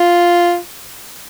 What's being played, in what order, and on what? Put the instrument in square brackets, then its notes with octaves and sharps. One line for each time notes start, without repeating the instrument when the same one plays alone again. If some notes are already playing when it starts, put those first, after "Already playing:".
Already playing: [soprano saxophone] F4